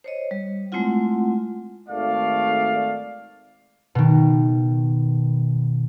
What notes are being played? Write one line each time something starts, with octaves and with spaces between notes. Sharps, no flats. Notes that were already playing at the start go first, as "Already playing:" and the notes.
C5 C#5 D#5
G3
G#3 A3 C4 E4 F4 F#5
G#1 A3 D5 F5
B2 D#3